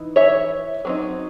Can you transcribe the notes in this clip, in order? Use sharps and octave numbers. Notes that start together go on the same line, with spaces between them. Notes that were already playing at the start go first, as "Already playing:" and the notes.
Already playing: E3 D#4
C#5 E5
F#3 C4 D#4